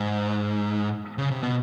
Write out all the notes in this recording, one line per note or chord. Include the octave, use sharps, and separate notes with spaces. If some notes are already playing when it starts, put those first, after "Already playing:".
Already playing: G#2
C#3
C3
B2